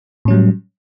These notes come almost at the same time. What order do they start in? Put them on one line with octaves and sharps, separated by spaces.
A2 C#4 F#3 G3